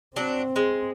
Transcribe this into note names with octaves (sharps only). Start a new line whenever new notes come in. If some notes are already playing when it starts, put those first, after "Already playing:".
F#3 C4 D4
G#3